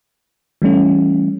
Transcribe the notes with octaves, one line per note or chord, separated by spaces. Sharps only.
E3 G3 A3 C#4